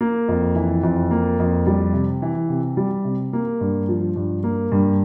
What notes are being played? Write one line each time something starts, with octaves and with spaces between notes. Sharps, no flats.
A#3
F2
E3
F2
A#3
F2
G3
C3
E3
C3
G3
C3
A#3
G2
F3
G2
A#3
G2